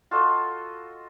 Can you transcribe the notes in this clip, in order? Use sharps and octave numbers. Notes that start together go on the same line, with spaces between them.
F4 F#4 A4 D#5